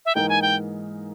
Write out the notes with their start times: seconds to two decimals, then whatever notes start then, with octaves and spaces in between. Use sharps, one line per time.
0.06 E5
0.15 G#2 E3 A#3 D#4 A#4 G5
0.29 G#5
0.42 G5